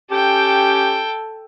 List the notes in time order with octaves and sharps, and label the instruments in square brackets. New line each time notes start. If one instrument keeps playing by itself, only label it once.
[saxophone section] C#4 G4 [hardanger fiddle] A4 G5